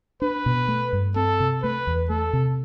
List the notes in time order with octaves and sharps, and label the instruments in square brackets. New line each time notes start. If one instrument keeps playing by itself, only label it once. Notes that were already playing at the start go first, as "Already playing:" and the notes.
[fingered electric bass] D4 [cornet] B4
[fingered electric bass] B2
A3
G2
[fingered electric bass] C4 [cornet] A4
[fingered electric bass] C3
[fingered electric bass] A3 [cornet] B4
[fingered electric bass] E2
[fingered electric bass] A3 [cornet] A4
[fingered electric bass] C3